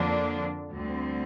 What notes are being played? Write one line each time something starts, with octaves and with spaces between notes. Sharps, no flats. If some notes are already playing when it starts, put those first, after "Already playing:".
Already playing: F2 D3 F3 A#3 D4
D2 D3 G3 C4